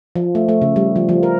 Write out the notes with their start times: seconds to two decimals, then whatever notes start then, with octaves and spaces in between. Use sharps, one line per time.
0.16 F3
0.35 A3
0.49 A3
0.62 C#3
0.76 G3
0.96 F3
1.09 F3
1.23 A#4